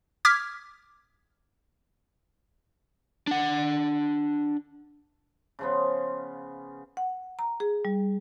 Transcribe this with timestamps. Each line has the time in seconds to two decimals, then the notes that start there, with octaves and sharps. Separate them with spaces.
0.25 D6 F6 G#6 B6
3.27 D4 F#5
5.59 C#3 F3 B3
6.97 F#5
7.39 A#5
7.60 G#4
7.85 G3